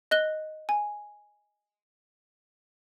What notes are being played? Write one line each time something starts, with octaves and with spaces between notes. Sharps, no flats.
D#5 F#6 G7
G#5